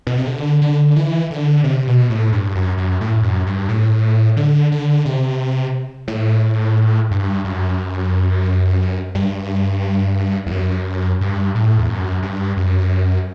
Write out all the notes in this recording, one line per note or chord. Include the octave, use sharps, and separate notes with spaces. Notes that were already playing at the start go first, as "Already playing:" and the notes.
B2
C3
D3
D3
E3
D3
C3
B2
A2
G2
F#2
F#2
A2
F#2
G2
A2
D3
D3
C3
A2
G2
F#2
G2
E2
F#2
G2
A2
E2
F#2
G2
F#2